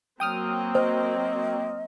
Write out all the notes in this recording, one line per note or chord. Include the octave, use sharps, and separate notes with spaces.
F#3 A#3 C4 G5 D#6 F6
C5 D#5